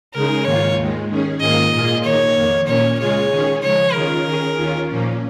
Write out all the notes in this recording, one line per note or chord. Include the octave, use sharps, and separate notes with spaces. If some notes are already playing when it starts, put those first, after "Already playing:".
C#3 G#3 D#4 G#4 A#4
G#2 D#3 A#3 F4 C#5
D#2 D#3 G#3
D#3 C#4 G#4
G#2 D#3 A#3 F4 G#4 D#5
A#2 A#3 F4 G#4
D#3 A#3 D#4 C#5
F2 D#3 A#3
A#2 A#3 C#4 C#5
C#3 G#3 F4 G#4 C#5
D#3 C#4 G#4
C#3 F3 G#3 C#5
D#3 C#4 F4 G#4 A#4
D#3 C#4 G#4
D#2 D#3 C#4 F4
A#2 F3 A#3 C#4